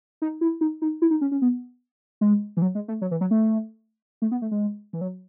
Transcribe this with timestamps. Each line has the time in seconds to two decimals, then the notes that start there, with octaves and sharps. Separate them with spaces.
0.22 D#4
0.41 E4
0.61 D#4
0.82 D#4
1.02 E4
1.11 D#4
1.21 C#4
1.31 C#4
1.42 B3
2.21 G#3
2.57 E3
2.62 F#3
2.75 G#3
2.88 A3
3.01 F#3
3.11 E3
3.21 F#3
3.31 A3
4.22 A3
4.31 B3
4.42 A3
4.51 G#3
4.93 E3
5.01 F#3